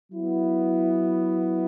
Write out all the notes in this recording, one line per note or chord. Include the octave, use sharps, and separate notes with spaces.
F#3 B3 E4